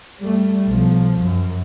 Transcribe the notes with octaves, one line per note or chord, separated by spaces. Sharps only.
G3 A3
B1 F3
F#2